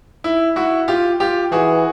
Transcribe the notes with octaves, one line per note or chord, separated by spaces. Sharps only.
E4
E4 F#4
F4 G4
F4 G4
E3 F#4 G#4